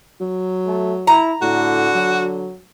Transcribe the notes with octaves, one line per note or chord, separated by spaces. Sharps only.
F#3
A3
E4 A#5
A2 D3 F#4
F#3